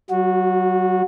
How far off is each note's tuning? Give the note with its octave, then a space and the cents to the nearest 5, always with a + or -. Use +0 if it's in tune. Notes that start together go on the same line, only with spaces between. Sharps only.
F#3 +30 F#4 -20